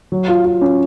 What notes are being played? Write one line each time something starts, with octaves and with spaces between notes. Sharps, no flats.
F#3
F4
F4
C#4